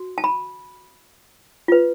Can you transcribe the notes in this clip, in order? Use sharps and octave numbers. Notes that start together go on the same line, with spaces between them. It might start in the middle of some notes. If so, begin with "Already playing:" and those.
Already playing: F#4
A5
B5
F4 B4